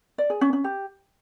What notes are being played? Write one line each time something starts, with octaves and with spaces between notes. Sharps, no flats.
D5
G#4
C#4
C#4
G4